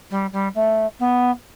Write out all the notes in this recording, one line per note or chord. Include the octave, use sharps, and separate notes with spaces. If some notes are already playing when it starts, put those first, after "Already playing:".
G3
G3
A3
B3